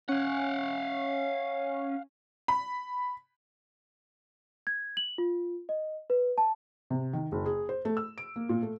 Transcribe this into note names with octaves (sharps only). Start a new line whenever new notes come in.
C#4 F5 F#5
B5
G#6
F#7
F4
D#5
B4
A5
C3
D#3
F#1
G#4
C5
A3
E6
D7
A#3
A#2
A3